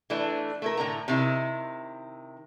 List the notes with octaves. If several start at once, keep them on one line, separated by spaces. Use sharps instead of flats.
E3 A3 D4
A3 E4 A#4
A2 D3 G5 A#5
C3 D#3 E4